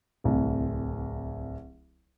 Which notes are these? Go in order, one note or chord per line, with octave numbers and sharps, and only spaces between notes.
D1 C2